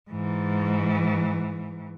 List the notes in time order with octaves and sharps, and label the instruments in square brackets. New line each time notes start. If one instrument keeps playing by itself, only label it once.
[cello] G#2 E3